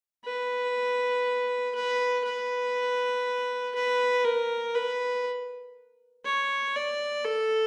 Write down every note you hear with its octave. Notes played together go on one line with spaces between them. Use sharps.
B4
B4
B4
B4
A#4
B4
C#5
D5
A4